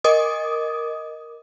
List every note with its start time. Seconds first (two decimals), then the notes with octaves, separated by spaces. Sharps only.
0.04 A#4 D#5 D6 D#6